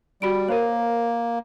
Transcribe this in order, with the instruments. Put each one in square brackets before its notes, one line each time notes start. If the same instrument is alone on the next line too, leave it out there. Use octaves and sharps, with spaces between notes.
[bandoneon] G3 [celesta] F#4 B5 D7
[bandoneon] A#3 [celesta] A#4 C5 C#5